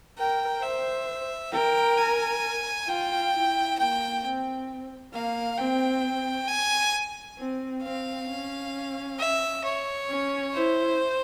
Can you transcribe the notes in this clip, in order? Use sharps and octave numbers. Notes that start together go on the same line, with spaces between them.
A#4 G5
C5 E5
A#4 G5
G#5
F4 G5
E4
A#3 G5
C4
A#3 F5
C4 G5
G#5
C4
C4 F5
C#4
E5
C#5
C#4
E4 C5